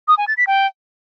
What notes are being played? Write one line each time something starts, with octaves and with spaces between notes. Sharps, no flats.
D#6
G#5
A6
B6
G5